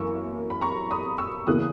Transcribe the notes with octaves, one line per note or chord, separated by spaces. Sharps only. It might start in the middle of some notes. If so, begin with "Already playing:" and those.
Already playing: F#2 E3 A#3 C#6 E6
B5
A#5 C#6
B5 D#6
C#6 E6
E2 C#3 E3 A#3 D#6 F#6